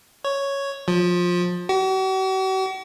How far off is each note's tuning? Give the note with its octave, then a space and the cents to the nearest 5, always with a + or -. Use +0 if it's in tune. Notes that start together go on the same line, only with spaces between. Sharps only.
C#5 +0
F3 +20
F#4 +45